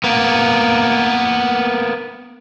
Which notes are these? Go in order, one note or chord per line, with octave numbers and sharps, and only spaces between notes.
A#3 B3